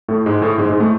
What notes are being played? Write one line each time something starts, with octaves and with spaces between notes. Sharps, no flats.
A2 A3
G#2 G#3
A2 A3
G#2 G#3
G#2 G#3
A2 A3